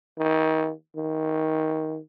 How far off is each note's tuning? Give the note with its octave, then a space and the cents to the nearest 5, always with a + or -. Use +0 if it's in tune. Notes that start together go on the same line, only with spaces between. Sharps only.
D#3 +30
D#3 +20